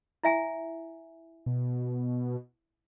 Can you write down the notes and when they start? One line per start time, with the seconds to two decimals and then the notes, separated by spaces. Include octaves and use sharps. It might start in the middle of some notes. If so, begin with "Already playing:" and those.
0.23 E4 E5 G#5
1.46 B2